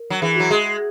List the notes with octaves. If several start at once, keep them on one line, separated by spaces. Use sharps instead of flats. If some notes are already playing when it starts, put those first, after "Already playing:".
Already playing: A#4
F#3
E3 G#4
F#3 F#4
G#3 G#4